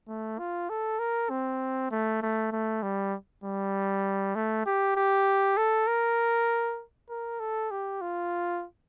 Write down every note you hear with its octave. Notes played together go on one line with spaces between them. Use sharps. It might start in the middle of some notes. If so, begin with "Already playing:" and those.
A3
F4
A4
A#4
C4
A3
A3
A3
G3
G3
A3
G4
G4
A4
A#4
A#4
A4
G4
F4